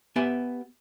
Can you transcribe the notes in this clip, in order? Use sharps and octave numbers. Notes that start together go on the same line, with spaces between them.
B3 G4 E5 G#5